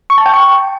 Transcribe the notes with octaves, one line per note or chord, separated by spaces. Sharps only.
C#6
A5
G5
C#6